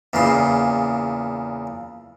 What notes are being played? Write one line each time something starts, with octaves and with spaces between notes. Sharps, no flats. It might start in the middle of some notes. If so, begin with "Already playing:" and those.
E2 A#2 C#3 C6